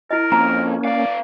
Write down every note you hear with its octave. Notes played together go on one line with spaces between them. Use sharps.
E4 A#4 D#5
F2 A#3 C#4 A#5
B3 D5 F5